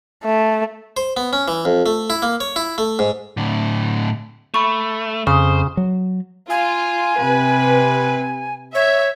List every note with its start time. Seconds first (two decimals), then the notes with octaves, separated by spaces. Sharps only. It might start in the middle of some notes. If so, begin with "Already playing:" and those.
0.24 A3
0.97 C5
1.17 B3
1.33 C#4
1.48 E3
1.65 F2
1.86 A3
2.10 E4
2.22 A#3
2.40 C#5
2.56 E4
2.78 A3
2.99 G#2
3.37 A2 D3
4.54 A3 B5 C#6
5.27 F2 C#3 C5 D#6
5.77 F#3
6.50 F4 G#5
7.20 C3 B4
8.75 C#5 E5